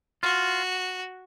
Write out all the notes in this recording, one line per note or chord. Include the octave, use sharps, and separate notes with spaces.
F4 F#4